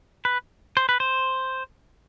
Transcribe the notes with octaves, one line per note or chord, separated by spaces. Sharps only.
B4
C5
B4
C5